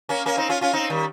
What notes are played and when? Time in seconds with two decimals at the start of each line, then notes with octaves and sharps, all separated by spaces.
0.09 A#3 C#4
0.26 A#3 C#4
0.37 C4 D#4
0.49 C#4 F4
0.61 C#4 F4
0.73 C4 D#4
0.90 D#3 G3